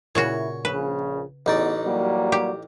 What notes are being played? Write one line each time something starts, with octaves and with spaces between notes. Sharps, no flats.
A#2 C#3 E4 F#4 C#5
A#1 C#3 B4
A1 E2 D#4 D5
F#3 G3 A#3
G4